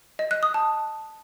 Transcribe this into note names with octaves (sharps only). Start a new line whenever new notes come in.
D#5
F#6
D#6
A5